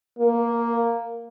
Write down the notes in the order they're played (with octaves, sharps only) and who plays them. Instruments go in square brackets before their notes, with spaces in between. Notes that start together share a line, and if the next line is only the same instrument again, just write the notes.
[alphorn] A#3